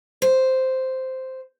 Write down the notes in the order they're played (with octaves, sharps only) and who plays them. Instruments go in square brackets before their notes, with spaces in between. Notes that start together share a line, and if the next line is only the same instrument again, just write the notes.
[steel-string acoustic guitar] C5